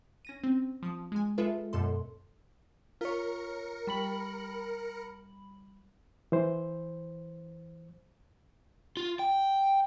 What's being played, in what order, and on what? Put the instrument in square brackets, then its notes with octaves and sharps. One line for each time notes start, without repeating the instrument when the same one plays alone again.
[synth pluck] C#4 A#6 D#7
C4
F3 D#6
G#3 G#5
G#3 F4 A4 B4 E5
F#2 B2 A4 C6
[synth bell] F4 C#5 [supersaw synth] A#4 C#7
[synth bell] G3 B5 F#7
[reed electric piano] E3 C5
[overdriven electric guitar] F4
G5